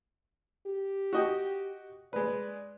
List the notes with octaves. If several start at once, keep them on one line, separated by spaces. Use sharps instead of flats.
G4
F#4 D#5 G5
G#3 B4 D5